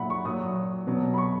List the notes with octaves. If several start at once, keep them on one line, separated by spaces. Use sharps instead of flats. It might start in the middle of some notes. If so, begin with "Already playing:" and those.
Already playing: A#2 F#3 E5 F#5 B5
C#6
A#2 F#3 D#6
B2 F#3
B5
C#6